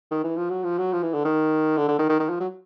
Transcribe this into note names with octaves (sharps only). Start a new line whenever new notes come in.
D#3
E3
F3
F#3
F3
F#3
F3
E3
D3
D#3
D3
D3
D#3
D#3
D#3
F3
F#3